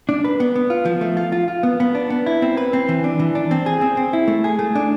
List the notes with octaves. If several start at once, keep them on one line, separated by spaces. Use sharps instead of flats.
D4
B4
B3
B3
F4
F3
A3
F4
F4
F4
B3
B3
D4
B3
E4
C4
B4
C4
E3
D4
E3
D4
C4
G#4
C4
C4
E4
A3
G#4
A3
D4